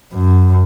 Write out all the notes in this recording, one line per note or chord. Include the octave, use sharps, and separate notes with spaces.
F#2